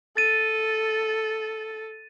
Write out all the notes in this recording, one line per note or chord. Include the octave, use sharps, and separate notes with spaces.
A4 A6 D#7